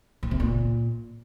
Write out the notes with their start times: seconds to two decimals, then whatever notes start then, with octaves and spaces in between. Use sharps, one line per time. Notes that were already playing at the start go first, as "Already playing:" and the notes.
0.23 A#2
0.31 C3
0.40 A#2